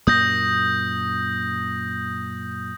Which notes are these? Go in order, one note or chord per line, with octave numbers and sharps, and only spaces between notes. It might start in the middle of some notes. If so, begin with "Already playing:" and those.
F#2 A#2 A#3 D#6 G6 A#6